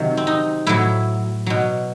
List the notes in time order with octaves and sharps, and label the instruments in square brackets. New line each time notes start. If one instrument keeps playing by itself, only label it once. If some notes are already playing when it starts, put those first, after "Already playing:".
Already playing: [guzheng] C3 D#3 F#3
C4
D#4
A2 F#3 E4
B2 F#3